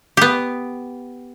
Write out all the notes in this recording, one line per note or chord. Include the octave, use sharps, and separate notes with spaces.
B3 G4